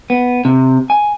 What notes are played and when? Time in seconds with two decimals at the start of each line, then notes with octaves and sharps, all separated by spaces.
0.10 B3
0.45 C3
0.90 G#5